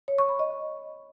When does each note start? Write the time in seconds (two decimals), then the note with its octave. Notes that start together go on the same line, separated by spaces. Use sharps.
0.08 C#5
0.18 C#6
0.29 B5
0.39 D#5